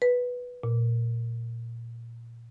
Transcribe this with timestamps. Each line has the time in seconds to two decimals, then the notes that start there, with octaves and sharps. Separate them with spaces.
0.02 B4
0.63 A#2